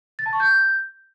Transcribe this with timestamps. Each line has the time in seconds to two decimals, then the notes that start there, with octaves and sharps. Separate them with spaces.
0.19 A6
0.26 A5
0.33 C#6
0.40 G6